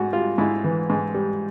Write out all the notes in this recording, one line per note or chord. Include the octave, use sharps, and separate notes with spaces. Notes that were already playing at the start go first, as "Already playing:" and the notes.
Already playing: G#2 F#4
G3 F4
G#2 E4
E3
G#2
G3